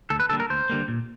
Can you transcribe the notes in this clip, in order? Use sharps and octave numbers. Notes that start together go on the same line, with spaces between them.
D2 A4
B4
D3 G3 A#3 A4
A#4
D2 C5
D3 G3 A#3
A#2